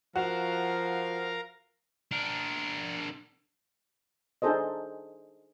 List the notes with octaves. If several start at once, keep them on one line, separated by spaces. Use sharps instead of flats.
F3 F#4 A#4 F5 A#5
D4 A#4
D4 D#4 G#4 A4 C5 D#5